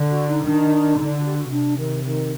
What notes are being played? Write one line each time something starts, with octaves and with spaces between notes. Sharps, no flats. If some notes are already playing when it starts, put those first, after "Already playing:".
Already playing: D3
F#4
D#4
D#3 D4
D3 D#4
F#4
G4
F#4
C3 D4
D#3
D#3